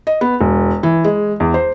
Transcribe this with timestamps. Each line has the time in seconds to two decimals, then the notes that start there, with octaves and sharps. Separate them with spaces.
0.07 D#5
0.21 B3
0.41 E1
0.83 E3
1.04 G#3
1.40 E2
1.54 C5